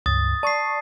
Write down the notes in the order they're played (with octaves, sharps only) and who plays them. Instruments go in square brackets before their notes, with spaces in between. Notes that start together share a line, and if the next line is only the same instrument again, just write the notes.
[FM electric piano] C#2 G2 [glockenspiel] D#6 A6
[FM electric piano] D5 C#6 [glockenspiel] A5 C7